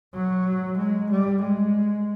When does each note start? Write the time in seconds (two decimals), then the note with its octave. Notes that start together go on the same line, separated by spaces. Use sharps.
0.14 F#3
0.78 G#3
1.11 G3
1.43 G#3